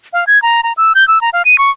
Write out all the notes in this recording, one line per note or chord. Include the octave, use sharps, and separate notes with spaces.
F5
G#6
A#5
A#5
E6
G6
E6
A#5
F5
D#7
C#6